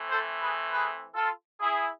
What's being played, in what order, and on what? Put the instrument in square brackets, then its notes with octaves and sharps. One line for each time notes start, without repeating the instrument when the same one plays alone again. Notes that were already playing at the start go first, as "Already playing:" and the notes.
Already playing: [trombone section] E3 A3 C4
A4 C5
G#4 B4
G#4 B4
F4 A4
E4 G#4